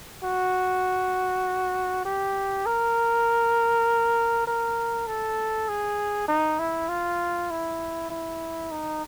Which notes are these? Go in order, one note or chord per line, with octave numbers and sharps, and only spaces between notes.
F#4
G4
A#4
A#4
A4
G#4
D#4
E4
F4
E4
E4
D#4